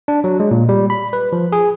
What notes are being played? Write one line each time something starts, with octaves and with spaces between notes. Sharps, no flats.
D4
F#3
G#3
A#2
G3
B5
B4
F3
G#4